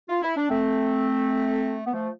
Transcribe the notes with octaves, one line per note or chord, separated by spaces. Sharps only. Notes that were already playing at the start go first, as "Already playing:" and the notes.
F4
E4
D4
A3 C4
B3
F3 A3